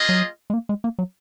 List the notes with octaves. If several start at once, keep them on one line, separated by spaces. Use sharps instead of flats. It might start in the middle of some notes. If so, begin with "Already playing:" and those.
Already playing: A#3 F4 G#4 D#5
F#3
G#3
A#3
G#3
A#3
F#3